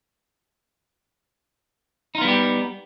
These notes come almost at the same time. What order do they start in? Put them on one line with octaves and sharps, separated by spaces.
D#4 F4 B3 G3 G4